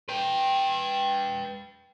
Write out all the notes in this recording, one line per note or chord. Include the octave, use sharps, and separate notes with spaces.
B4 G5